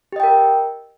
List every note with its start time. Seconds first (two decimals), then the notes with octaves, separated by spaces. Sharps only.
0.12 G4
0.16 D#5
0.20 G5
0.23 A#4